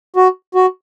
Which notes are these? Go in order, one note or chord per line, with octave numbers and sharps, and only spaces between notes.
F#4
F#4